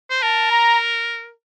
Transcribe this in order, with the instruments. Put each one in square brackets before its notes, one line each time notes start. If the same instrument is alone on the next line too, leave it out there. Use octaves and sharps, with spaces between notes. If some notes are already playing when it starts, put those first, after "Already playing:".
[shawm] C5
[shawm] A#4 [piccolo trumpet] A5
[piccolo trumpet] A#5